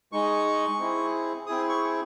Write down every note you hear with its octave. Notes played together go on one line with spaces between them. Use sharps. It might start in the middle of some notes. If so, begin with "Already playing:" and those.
G#3 D#4 G#4 C#6
C4 E4 G#4
C4 E4 G#4 D#6
C#6